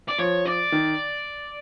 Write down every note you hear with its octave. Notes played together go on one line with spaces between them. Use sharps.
D5
F3 C#5
D5
D#3